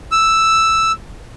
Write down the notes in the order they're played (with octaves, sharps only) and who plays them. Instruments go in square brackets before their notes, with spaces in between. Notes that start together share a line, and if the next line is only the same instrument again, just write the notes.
[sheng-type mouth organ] E6